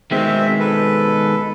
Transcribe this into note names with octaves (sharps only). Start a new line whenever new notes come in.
B2 D#3 G#3 C4 E5
A4 B4